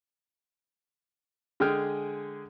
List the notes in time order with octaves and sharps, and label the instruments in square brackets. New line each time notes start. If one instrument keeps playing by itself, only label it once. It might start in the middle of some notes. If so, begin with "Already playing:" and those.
[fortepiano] D3 G#3 G#4 G5 F6